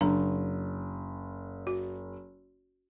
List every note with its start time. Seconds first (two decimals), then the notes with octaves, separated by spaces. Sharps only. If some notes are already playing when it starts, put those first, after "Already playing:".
0.01 F#1 D4 A#5
1.67 F#4